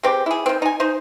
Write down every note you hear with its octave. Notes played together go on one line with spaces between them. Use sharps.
G#3 C4 G4
E4 G#4
D#3 C4
D#4 G#5
D#4 C5